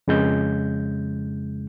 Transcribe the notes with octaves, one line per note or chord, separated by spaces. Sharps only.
F2 C#3 G#3 G6